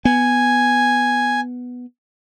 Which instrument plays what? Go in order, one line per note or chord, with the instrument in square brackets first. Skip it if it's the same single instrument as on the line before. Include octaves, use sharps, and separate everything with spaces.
[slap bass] B3 [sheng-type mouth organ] G#5